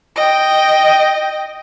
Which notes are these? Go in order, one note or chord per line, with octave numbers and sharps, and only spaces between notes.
D#5 G5